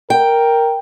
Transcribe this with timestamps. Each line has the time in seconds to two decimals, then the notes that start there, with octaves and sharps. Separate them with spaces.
0.10 A#4 G5